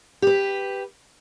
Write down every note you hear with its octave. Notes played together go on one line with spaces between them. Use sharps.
G4 B4